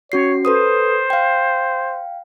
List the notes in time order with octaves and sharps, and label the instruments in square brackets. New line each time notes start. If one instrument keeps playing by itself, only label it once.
[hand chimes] C#4 F#4 C7 [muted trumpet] C#5
[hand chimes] A4 B4 D#6 [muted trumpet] C5
[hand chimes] F5 G5